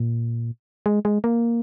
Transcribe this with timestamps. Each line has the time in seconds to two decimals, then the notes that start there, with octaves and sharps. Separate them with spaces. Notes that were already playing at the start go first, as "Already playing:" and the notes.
Already playing: A#2
0.86 G#3
1.05 G#3
1.24 A#3